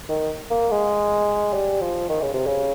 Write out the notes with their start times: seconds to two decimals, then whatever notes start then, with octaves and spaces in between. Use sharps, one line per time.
0.09 D#3
0.50 A#3
0.71 G#3
1.54 G3
1.81 F3
2.09 D#3
2.22 C#3
2.34 C3
2.47 C#3